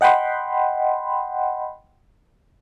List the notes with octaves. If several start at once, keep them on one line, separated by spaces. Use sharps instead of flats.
D#5 F#5 G5 B5 C6